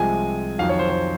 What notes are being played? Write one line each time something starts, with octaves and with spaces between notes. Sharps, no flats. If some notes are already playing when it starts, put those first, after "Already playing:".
Already playing: C2 C3 F3 G#3 G#5
F2 D#3 F#3 F5
C#5
C5
C5